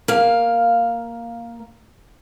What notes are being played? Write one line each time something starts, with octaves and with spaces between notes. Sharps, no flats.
A#3 F5